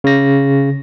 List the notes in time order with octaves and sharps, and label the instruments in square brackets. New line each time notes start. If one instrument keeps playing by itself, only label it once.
[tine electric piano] C#3 A#6